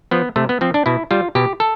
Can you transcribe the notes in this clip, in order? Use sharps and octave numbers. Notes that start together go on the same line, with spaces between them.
F3 B3
C3 A3
B3
F3 C4
D4
B2 E4
G3 F4
B2 G4
A4